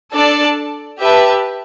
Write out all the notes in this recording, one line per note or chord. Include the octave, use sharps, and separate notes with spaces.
D4 A4 D5 A5
G4 B4 E5 A5